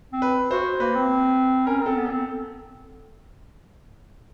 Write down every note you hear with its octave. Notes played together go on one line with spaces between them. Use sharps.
C4
B4
F#4 C5
A#3 B4
C4
C#4 A#4
A#4
C4 A4
B3
C4 A4